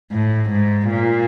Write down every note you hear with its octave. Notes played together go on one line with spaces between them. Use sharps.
A2
G#2
A#2